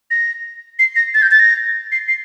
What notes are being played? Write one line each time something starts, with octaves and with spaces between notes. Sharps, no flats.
A#6
C7
A#6
A6
G6
A6
A#6
C7
C7